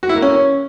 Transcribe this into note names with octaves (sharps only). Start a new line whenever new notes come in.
F#4
E4
A#3
C#4